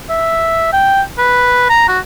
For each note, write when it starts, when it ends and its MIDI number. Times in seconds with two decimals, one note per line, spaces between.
0.10 0.71 76
0.73 1.01 79
1.18 1.65 71
1.69 1.88 82
1.88 1.98 66